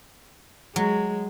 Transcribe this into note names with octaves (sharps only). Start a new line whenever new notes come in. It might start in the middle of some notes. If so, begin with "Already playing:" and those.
F#3 G#3